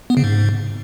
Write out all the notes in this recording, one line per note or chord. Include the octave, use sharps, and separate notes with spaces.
B3
C#3
G#2